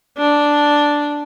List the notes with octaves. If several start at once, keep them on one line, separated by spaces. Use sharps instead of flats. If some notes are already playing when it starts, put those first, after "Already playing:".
D4